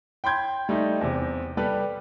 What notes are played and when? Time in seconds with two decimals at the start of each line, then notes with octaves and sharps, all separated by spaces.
0.24 G5 B5 C6 G6 G#6
0.69 G3 A3 D#4
1.01 E2 C3
1.57 G3 G4 A4 B4